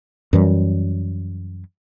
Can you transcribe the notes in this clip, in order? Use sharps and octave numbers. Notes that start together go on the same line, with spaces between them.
F#2 E3 G3